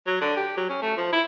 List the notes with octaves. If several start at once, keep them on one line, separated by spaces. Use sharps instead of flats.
F#3
D3
G4
F#3
C#4
A3
F3
E4